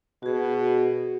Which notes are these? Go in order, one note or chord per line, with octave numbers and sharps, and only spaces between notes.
B2 F#4 G#4